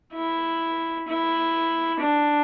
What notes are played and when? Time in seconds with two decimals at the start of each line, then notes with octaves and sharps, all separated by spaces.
0.13 E4
1.08 E4
2.00 D4